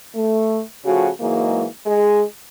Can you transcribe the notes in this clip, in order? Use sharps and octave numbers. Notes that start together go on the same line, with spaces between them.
A3
C#3 F3 A3 F#4
G#2 E3 F#3 G#3 A#3
G#3 G#4